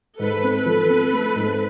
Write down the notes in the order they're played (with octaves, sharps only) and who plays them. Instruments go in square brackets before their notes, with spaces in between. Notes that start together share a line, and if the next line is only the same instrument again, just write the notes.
[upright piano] G#2 [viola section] A4 B4
[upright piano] C4
[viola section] A4 B4
[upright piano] F3
C4
A3
G#2